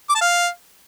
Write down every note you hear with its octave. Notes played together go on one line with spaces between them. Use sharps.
D6
A5
F5